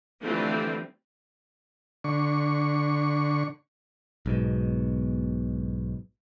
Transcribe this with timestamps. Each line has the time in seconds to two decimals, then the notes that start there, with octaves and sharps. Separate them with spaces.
0.22 D3 E3 F3 G3 A3 C4
2.04 D3 C#6
4.26 B1 G#2 B2